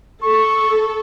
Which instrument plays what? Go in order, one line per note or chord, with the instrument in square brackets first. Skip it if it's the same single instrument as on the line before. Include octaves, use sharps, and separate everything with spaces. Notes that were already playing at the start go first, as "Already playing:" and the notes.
[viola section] A4 [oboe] C#6